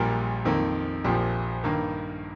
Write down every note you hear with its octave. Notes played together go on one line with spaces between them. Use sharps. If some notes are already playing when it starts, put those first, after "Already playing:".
Already playing: A#1 A#2 G3 A#4
F2 D#3 A#3
A#1 A#2 F3 G4
G2 D#3 A#3